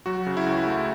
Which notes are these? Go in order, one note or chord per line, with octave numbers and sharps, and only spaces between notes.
F#3 F#4
C#3
E4
C#2
A3